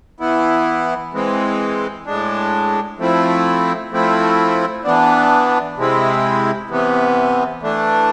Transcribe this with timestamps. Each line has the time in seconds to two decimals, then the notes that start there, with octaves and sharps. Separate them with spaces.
0.20 E3 B3 E4
1.13 E3 G#3 C4
2.06 A2 G#3 D4
2.99 F3 A3 C4 E4
3.91 F3 A3 C4 E4
4.84 E3 B3 D4
5.77 C3 G#3 C4 E4
6.70 C3 E3 B3
7.62 E3 A3 D4